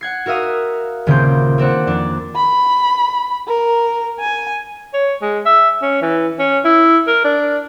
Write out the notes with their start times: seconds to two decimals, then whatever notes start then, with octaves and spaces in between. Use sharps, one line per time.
0.01 F#5 G#6 C7
0.26 F#4 A#4 E5 F5 D#6
1.07 D#1 C#3 A#3 C4 C6 G6
1.58 A#3 C4 D4 F#5
1.87 F2 D4
2.36 B5
3.47 A#4
4.20 G#5
4.94 C#5
5.22 G#3
5.46 E5
5.82 C#4
6.02 E3
6.39 C#4
6.65 E4
7.07 A#4
7.25 D4